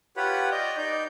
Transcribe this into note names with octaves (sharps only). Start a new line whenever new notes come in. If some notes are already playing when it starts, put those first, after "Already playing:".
F4 G4 B4 C#5 F#5 B5
D5 D#5 G6
D#4 D5 G6